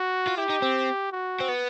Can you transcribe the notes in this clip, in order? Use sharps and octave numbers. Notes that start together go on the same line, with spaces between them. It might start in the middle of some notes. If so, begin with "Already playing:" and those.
Already playing: F#4
F4
E4 G4
D#4
C4
F#4
C4
B3